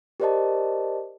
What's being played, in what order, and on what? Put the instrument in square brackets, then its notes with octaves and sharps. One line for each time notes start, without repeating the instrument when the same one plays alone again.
[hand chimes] G4 A#4 C5 D5 D#5 A5